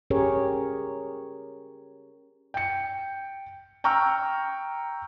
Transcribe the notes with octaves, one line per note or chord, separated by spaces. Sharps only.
C#4 G4 G#4 A#4 C#5
G5 C#7
G5 A#5 C#6 E6 F6